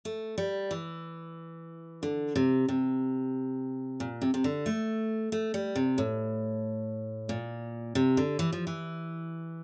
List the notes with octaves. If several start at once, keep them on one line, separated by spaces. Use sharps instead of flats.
A3
G3
E3
D3
C3
C3
A#2
C3
C3
D3
A3
A3
G3
C3
A2
A#2
C3
D3
E3
F3
E3